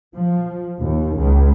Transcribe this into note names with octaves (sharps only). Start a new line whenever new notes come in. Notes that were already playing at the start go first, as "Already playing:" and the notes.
F3
D#2
C#2